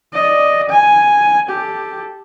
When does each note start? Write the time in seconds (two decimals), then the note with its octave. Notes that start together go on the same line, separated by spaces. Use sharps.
0.13 D5 D#5
0.70 G#5
1.49 G4 A4